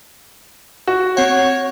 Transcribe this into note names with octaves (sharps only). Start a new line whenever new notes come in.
F#4
C4 C#5 F#5